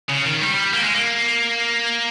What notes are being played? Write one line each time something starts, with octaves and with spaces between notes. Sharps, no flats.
C#3
D#3
G3
A#3
G#3
A#3